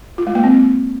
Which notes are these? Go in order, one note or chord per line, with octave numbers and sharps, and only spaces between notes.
F4
G#3
A#3
C4